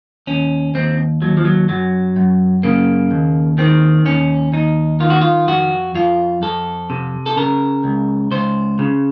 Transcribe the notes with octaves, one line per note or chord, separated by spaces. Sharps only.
D#2 C#4
D#2 C4
D#2 F#3
F3
F#3
F#2 F#3
F#2
C#3 A#3
D#2
D#3 C4
D#2 C#4
D#2 D#4
D#3 F4
F#4
F4
F2 F#4
F2 F4
F2 A4
C3
A4
C#3 A#4
C#2
C#2 C5
C#3